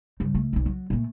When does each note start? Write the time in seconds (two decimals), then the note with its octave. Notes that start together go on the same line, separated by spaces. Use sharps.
0.20 G2 C#3
0.35 C#2 A3
0.53 B1 C3
0.66 F#3
0.90 A#2 A3